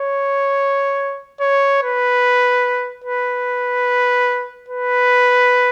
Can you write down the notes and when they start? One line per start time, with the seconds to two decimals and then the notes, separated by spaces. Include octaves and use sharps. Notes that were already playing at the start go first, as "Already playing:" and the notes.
Already playing: C#5
1.41 C#5
1.82 B4
3.04 B4
4.68 B4